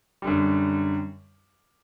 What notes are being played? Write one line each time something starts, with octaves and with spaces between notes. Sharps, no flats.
F#2 D3 G3